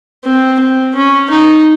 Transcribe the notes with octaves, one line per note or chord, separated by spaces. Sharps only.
C4
C4
C#4
D#4